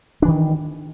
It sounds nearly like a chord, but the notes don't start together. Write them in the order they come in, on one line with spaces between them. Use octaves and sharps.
D4 E3 D#3